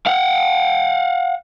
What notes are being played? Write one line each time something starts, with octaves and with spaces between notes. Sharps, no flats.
F5 F#5